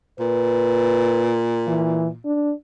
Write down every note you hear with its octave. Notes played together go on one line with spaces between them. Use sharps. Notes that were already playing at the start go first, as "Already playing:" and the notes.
A#2 B4
E3
D4